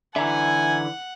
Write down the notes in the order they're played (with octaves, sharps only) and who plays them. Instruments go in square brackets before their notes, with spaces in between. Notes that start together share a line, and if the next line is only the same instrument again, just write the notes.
[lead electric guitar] D3 E3 [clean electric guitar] E5 A#5 [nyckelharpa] F#5 [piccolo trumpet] G#5